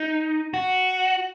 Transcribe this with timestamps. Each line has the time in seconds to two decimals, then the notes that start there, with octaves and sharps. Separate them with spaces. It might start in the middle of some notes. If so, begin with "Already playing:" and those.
Already playing: D#4
0.54 F#4